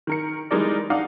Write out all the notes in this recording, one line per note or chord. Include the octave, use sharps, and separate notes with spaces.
D#3 A#4 C#7
E3 G3 G#3 D#4 A#4 D5
D4 D#4 F5 F#5